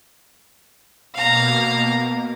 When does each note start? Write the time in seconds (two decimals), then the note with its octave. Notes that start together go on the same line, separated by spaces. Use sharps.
1.15 B2 A#3 F5 A#5